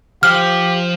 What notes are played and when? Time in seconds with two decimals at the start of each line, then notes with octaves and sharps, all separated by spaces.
0.23 F3 G4 F5 F6